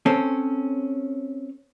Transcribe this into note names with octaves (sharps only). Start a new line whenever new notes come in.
C4 C#4 A4